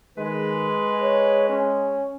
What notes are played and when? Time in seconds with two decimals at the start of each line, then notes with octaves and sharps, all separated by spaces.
0.17 D#3 G#3 B4
1.01 C#5
1.49 C#4